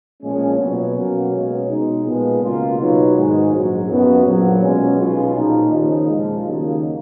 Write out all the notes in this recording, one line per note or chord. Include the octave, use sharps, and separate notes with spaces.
A#1 A#2 F3 G#3 C#4
B2 F#3 B3
B2 F#3 A#3 C#4 F#4
B2 G#3 C#4
B2 G#3 D#4
A#2 F3 G#3 B3
C#2 B2 A#3 F4
B2 F#3 B3 D#4
G#2 D#3 G#3 D#4 F#4
A#1 G#2 F#3
F#2 F3 B3 F#4
A#1 A#2 F#3
B2 G#3 C#4
B1 B2 G#3 C#4 F4
A#2 F3 A#3 D#4
D#2 C#3 F3 A#3 D#4
A#1 A#2 F3 G#3
D#2 C#3 F#3 A#3 D#4